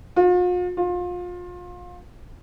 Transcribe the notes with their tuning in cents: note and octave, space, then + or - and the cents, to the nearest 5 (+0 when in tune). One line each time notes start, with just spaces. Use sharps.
F4 +45
F4 +30